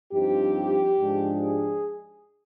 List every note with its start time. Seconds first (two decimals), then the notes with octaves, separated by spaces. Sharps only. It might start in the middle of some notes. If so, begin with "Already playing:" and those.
0.12 G2 F3 C4 D#4 G4
0.98 G#2 F3 G#3 D4
1.42 G#4